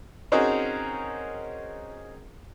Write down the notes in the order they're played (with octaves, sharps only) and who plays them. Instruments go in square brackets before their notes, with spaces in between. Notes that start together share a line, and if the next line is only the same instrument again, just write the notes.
[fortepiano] C4 C#4 D#4 F#4 G#4 A#4